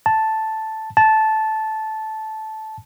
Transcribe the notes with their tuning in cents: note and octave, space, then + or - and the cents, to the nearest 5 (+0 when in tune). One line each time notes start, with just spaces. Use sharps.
A5 +0
A5 -10